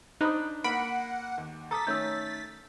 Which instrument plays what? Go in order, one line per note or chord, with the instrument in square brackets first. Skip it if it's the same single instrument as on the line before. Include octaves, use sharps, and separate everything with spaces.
[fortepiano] D4 C5 B5 [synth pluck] D#4 [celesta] D#6 F#6
[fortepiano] A#3 [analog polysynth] F#5 [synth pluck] B5 [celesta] D7
[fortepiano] D#2
[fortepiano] A4 D6 D#6 [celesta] A#5 [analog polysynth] A6 B6
[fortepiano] D#3 A3 C#4 [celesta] E6 G6